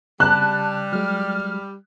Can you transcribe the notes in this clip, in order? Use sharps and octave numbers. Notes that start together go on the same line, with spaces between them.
C#3 G3 A5 F#6
F#3 G#3 F6